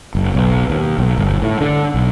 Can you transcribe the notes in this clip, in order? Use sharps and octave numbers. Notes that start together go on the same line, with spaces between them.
F#1
B1
D#2
B1
G1
A2
D3
B1